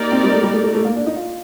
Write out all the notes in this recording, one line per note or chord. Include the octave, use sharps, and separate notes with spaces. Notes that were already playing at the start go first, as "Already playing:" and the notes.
Already playing: A#3 D#4 G4 A#4 D5
C4
G3
A3
G3
A3
A3
A3
A#3
D4
D#4
F4